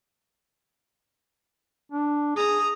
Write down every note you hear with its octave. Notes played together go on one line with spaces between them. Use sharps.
D4
G#4 A#5 D#6